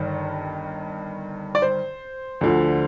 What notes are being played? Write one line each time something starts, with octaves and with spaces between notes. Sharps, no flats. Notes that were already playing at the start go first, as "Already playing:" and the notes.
Already playing: G1 G2 D#3
D5
C5
D2 D3 F3